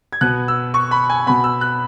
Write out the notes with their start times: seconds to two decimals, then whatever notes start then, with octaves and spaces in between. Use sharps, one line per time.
0.12 G#6
0.21 B2 B3 F#6
0.48 E6
0.74 C#6
0.91 B5
1.09 G#5
1.26 B2 B3 B5
1.44 E6
1.61 F#6